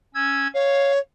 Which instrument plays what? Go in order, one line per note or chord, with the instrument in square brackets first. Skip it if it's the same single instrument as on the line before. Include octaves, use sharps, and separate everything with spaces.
[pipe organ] C#4 E6 G#6
[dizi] C#5 [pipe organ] F5